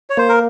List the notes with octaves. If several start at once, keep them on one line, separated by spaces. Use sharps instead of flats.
C#5
A#3 C5
A#4